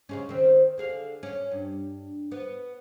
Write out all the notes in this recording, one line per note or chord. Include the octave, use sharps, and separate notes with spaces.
C#3 G#3 C#4
D#3 C4
D3 G#4 F5
C#4
G2
B3